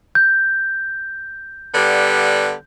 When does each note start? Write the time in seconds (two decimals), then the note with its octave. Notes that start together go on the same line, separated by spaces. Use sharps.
0.15 G6
1.75 D3 G3 B3